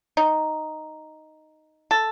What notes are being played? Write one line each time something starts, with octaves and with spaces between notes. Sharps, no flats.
D#4
A4